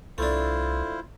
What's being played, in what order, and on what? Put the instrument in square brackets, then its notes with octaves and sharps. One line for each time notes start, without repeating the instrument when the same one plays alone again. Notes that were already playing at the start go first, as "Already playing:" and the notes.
[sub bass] C2 [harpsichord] A3 D4 [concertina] E4 F4 C5